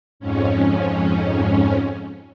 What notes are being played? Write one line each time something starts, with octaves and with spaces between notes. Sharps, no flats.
F2 G#2 C#4